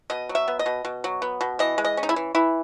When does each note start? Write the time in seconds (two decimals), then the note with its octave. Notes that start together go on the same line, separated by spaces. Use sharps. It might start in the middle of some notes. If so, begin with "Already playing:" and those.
0.10 B2 D#5
0.29 F#3
0.35 E5
0.48 B3
0.59 D#5
0.66 B2
0.85 B2
1.04 F#3
1.22 B3
1.41 B2
1.59 E3 D#5
1.78 G#3
1.85 D#5
1.97 C#4
2.03 D#4
2.09 E4
2.16 E3
2.35 E3 E4